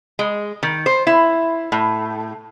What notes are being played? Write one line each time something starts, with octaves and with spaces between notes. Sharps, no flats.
G#3
D#3
C5
E4
A2